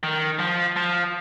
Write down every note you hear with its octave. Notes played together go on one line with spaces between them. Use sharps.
D#3
F3
F3